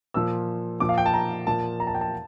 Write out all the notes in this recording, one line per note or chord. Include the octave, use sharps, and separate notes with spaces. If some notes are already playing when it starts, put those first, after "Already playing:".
A#2 F3 E6
A#2 F3 D6
F5
G5
A5
A#5
A#2 F3 A5
A#5
A5
G5
A5